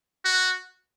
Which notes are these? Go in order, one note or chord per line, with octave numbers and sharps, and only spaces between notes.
F#4